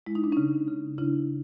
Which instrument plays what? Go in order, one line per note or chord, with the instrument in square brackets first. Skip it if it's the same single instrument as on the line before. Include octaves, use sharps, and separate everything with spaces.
[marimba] G#3 E4
D#4
D4
C#3 C#4 D#4
C#3
C#3 D4 E4